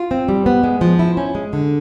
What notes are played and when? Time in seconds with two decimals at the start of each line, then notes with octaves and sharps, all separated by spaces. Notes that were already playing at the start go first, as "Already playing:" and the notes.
Already playing: F4
0.11 C4
0.29 G3
0.46 B3
0.64 G#3
0.81 F3
0.99 E4
1.17 C#4
1.35 G#3
1.53 D3